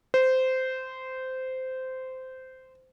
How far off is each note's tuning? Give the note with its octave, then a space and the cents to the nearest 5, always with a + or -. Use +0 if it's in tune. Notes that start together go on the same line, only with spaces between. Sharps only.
C5 -15